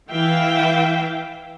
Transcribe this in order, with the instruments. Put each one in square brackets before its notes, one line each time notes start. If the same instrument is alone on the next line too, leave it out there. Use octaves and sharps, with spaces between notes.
[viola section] E3 E5 F5 G5